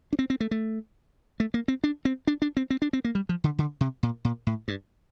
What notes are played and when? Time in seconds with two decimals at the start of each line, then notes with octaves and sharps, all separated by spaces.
0.13 D4
0.19 C4
0.30 C4
0.40 A3
0.51 A3
1.40 A3
1.54 A#3
1.68 C4
1.84 D4
2.05 C4
2.27 D4
2.42 D4
2.57 C4
2.70 C4
2.82 D4
2.93 C4
3.05 A#3
3.15 G3
3.29 F3
3.44 D3
3.58 D3
3.81 C3
4.03 A#2
4.25 A#2
4.47 A2
4.68 G2